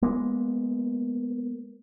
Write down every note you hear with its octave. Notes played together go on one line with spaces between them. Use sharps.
G#3 A#3 B3